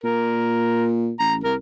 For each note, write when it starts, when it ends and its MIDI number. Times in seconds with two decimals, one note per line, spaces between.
0.04 1.12 46
0.04 0.88 70
1.20 1.44 33
1.20 1.34 82
1.44 1.56 36
1.44 1.55 70